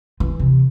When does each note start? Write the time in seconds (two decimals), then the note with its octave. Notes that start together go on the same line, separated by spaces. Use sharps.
0.20 E3
0.39 C3